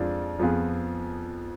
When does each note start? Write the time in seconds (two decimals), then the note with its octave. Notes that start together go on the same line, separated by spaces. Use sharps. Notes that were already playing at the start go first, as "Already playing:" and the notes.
Already playing: F2 F3 G#3 D4 F4
0.39 F2 F3 B3 F4 G#4